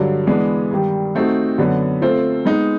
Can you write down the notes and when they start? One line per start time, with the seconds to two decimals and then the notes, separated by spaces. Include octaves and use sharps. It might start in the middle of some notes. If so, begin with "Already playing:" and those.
Already playing: G2 D3 F#3
0.27 E3 G#3 B3 D4
0.71 G2 D#3 G3
1.15 A3 C4 D#4 F#4
1.58 F#2 D3 F#3 B3
2.01 A3 C4 F4 A4 C5
2.45 G#3 B3 D#4